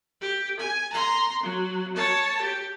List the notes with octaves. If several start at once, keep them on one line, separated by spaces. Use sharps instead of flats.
G4
G#5
A#5 C6
F#3
C#5 A5
G4